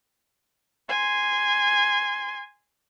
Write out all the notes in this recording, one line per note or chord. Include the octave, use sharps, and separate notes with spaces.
G#5 C6